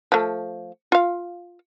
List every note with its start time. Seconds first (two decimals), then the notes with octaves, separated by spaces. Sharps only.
0.12 F3 A3
0.92 F4 F5